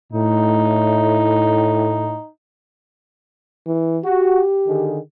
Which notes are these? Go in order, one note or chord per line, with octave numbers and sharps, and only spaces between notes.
A2 D#4
E3
F#4 G4
D3 D#3 G#4